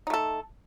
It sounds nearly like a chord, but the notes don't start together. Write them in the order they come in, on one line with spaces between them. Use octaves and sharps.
D#4 A3 A4